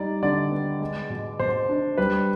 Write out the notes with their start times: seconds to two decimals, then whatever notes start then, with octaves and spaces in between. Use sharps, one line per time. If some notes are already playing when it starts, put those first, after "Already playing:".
Already playing: G3 D#4 D5
0.23 D3 D5
0.52 B3
0.80 G#3
1.10 B2
1.39 B2 C5
1.69 D4
1.98 G3 B4